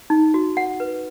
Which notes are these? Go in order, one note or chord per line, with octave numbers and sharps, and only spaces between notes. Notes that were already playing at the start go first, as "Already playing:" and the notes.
D#4
F#4
F#5
B4